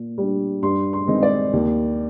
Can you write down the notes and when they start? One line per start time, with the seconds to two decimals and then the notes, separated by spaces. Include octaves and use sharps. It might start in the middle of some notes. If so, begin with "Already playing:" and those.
Already playing: A#2
0.18 G3 D4
0.62 G2 C6
0.93 C6
1.07 D#3 G#3 C4 D#4
1.23 D5
1.53 D#2